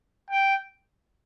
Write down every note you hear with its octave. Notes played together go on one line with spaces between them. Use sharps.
G5